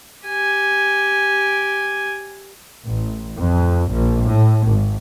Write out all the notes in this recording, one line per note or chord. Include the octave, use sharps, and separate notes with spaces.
G4 G#5
A1
F2
A#1
A2
G#1